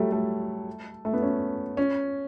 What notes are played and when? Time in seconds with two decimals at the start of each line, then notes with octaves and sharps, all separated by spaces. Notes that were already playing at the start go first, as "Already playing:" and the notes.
Already playing: F#3 G3 A3
0.12 A3
1.05 A3
1.13 B3
1.22 C#4
1.77 C#4